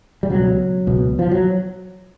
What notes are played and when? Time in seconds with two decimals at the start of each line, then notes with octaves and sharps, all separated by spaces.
0.23 G3
0.30 C#2 B2 F#3
0.87 C#2 B2
1.19 F3
1.31 F#3